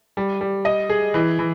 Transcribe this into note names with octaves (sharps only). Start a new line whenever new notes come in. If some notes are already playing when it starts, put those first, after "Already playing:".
G3
G3
D#5
G#4
E3
E3